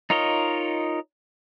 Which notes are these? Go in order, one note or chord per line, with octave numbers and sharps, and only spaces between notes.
D#4 F4 A#4 C#5 D#5